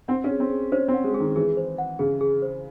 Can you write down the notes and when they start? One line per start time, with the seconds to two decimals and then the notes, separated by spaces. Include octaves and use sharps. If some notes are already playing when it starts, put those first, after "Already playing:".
0.08 C4 F#5
0.24 C#4
0.30 G#4
0.40 C4
0.51 G#4
0.72 C#4 C5
0.88 C4
0.94 F#5
1.04 G#3
1.14 G#4
1.20 D#3
1.36 E3 G#4
1.57 C5
1.78 F#5
1.99 C#3 G#4
2.21 G#4
2.42 C5